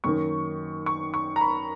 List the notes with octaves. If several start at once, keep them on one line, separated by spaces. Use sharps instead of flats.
F#2 D#3 A#3 C#6
C#6
C#6
A#5
B5